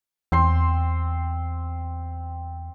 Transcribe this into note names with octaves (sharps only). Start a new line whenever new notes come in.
E2 C4 C6